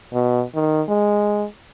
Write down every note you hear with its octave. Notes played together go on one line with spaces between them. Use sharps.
B2
D#3
G#3